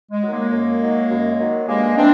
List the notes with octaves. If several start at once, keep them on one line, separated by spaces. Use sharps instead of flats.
G#3
D#3 F#3
G#3 A#3
F#2
D#3 F#3
F#2
D#3 F#3
G2 G#3 A#3
E3 C4 D4